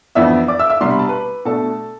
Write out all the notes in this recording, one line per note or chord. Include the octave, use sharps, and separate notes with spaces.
F2 E3 B3 D4 E5 E6
D5 D6
E5 E6
E5 E6
C2 B2 G3 D4 C6
B5
A5
B4 B5
B2 A3 D4 A4 A5